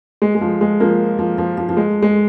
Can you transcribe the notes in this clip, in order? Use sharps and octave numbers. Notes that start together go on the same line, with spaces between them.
G#3
G#3
F3
G#3
F3 A#3
F3
F3
F3
F3
G#3
G#3